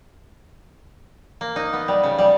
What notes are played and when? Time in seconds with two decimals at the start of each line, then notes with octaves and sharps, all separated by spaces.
1.41 A#3
1.56 D#4
1.73 B3
1.88 G3
2.03 C#3
2.19 G3